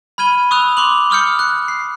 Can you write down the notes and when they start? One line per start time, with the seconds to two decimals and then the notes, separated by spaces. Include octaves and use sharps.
0.18 B5 F6 G#6 D#7 G7
0.51 C#6 D#6 E6 F#6 F7
0.77 C6 D6 F#6 F7 F#7
1.10 C#6 D#6 F6 G6 C#7
1.39 F#6
1.68 C7